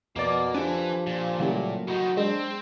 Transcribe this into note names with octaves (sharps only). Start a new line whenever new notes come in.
F2 B2 A#3 D5
F3 D4 G4 A4 B4 G#5
A#2 F3
A2 C#3 E3 F#3 G3 A#3
A2 D#4 F#4
G#3 C4 D4